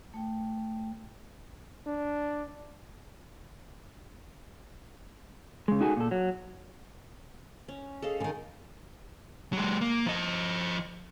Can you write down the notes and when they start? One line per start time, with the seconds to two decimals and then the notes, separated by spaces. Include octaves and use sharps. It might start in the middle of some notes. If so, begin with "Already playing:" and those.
0.14 A3 G5
1.86 D4
5.68 C#3 G#3
5.81 D#4 F#4 G#4 A4 G#5
5.97 A#2 A4
6.11 F#3
7.68 C#4
8.02 G#4 A4 D#5 F5
8.20 D3 D#3 G#5
9.53 F#3 G#3
9.81 A#3
10.06 F3 D#5